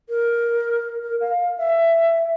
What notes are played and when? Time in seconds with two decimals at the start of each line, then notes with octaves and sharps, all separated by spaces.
0.09 A#4
1.03 A#4
1.21 F5
1.58 E5